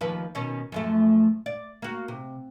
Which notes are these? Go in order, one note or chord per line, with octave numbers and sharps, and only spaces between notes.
D#2 F3 B4
B2 D#3 C#4
F#2 F3 A3
D5
A#3 F#4
C3